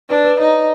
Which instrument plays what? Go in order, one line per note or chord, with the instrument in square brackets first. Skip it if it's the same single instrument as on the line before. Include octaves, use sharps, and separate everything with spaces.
[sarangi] D4 [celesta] B4
[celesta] B4
[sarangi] D#4 [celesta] C#5